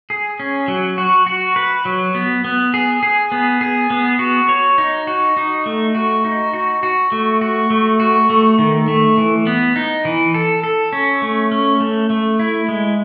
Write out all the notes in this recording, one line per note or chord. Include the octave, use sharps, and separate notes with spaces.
G#4
C#4
F#3
F#4
F#4
B4
F#3
B3
B3
G#4
G#4
B3
G#4
B3
F#4
C#5
D#4
F#4
D#4
A3
F#4
D#4
F#4
F#4
A3
F#4
A3
F#4
A3
D#3
A3
E3
B3
D#4
E3
A4
A4
C#4
A3
C#4
A3
A3
E4
G#3